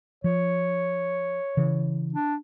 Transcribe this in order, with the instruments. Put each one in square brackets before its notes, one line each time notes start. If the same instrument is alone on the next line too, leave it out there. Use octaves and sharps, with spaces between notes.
[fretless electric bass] F3 [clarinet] C#5
[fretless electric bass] C#3 E3
[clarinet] D4